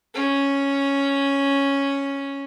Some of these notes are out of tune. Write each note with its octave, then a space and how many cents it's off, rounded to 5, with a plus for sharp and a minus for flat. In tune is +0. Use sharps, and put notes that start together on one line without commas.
C#4 +0